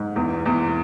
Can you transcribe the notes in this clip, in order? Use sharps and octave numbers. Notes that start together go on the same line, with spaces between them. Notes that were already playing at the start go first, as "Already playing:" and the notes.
Already playing: G#2
E2
E2